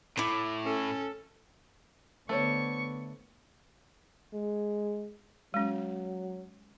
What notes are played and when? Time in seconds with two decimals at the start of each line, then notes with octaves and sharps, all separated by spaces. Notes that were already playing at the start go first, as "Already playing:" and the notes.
0.18 A2 E4 D6
0.65 C#4 A4
2.29 D3 A3 B3 C5 C#5 C#6 C#7
4.34 G#3
5.54 F#3 G#3 C#4